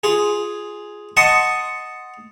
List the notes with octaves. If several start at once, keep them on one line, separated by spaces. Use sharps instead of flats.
F4 G#4
D#5 F#5 A5 C6 C#6 D#6